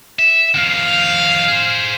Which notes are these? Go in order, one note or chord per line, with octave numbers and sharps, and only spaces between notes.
E5
F2 D#3 F5
G#4 C5